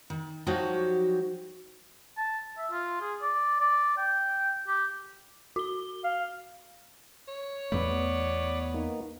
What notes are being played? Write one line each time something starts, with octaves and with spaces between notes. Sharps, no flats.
D#3
F3 F#3 D#4 F#4 G4
A5
E5
F4
G#4
D5
D5
G5
G4
F#4 G7
F5
C#5
E2 A3 B3 D5 B5 D6
A#3 D#4